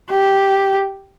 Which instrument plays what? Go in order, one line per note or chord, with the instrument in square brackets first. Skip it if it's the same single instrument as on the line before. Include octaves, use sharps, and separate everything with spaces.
[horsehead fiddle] G4